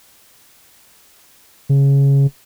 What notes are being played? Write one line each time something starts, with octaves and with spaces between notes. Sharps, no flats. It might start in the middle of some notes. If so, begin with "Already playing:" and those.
C#3